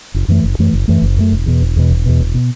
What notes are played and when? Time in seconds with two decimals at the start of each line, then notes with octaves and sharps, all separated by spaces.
0.14 F#1
0.28 F#2 E3 A3
0.44 F#1
0.59 F#2 E3 A3
0.74 F#1
0.88 F#2 E3 A3
1.02 F#1
1.17 F#2 E3 A3
1.32 E1
1.46 E2 B2
1.62 E1
1.76 E2 B2
1.90 E1
2.06 E2 B2
2.20 E1
2.34 B2